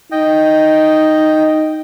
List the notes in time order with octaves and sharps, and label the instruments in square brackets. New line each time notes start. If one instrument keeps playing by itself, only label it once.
[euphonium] D#4 [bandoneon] D#5 G5